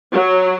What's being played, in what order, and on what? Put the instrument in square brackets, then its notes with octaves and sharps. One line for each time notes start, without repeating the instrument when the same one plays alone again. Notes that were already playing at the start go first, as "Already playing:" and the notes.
[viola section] F#3